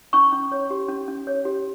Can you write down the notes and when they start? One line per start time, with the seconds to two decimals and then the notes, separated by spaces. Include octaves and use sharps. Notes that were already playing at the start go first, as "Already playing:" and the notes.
0.13 C#4 C#6
0.33 C#4
0.52 C#5
0.71 G4
0.89 C#4
1.08 C#4
1.27 C#5
1.45 G4